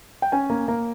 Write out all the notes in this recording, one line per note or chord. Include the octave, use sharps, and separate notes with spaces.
G5
C#4 G#5
A#3
A#3